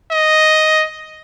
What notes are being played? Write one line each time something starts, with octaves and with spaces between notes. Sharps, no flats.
D#5